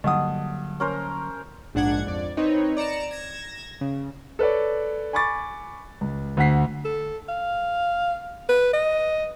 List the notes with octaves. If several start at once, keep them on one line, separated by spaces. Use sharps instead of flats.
G2 D3 F#3 A#3 D#5 F#5 D#6
C#4 A#4 C5
A#1 G#2 D4 F#5 G#6
F2 D5
C4 D#4 B4 C#5
D5 A#5 C#7 E7
G#6 A#6 E7
C#3
A4 B4 C#5 D5
G#5 B5 C#6 D6 A6
C#2
D2 D3 F#5 B6 C7
A4
F5
B4
D#5